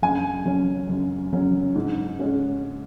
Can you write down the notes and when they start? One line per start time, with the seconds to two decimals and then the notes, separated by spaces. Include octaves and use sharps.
0.02 F#2 G#5
0.45 F#3 C#4
0.89 F#2
1.33 F#3 C#4
1.75 G#2
2.19 G#3 C#4